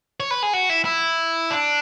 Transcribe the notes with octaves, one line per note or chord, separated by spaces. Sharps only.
C#5
B4
G#4
F#4
E4
E4
D4